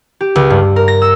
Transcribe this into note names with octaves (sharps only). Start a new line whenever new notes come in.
G4
C#2
G2
A#4
A#6
E6